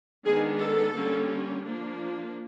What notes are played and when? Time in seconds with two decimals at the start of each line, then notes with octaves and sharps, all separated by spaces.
0.25 D#3 G#3 B3 D4 G#4
0.60 A4
0.94 D3 G3 A#3 C#4
1.63 F3 A#3 D4